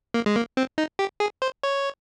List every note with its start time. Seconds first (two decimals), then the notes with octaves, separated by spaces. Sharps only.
0.14 A#3
0.26 G#3
0.36 A#3
0.57 C4
0.78 D#4
0.99 G4
1.20 G#4
1.42 C5
1.63 C#5